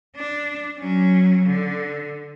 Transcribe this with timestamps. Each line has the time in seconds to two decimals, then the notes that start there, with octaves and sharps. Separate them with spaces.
0.16 D4
0.78 F#3 C#4
1.46 D3